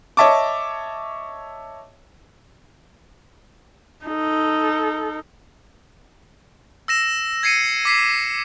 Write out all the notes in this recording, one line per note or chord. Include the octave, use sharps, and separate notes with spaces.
C#5 D#5 E5 A5 C#6 D6
D#4 A4
E6 A#6 E7
G#6 A#6 C7 C#7 D#7
D6 B6 C7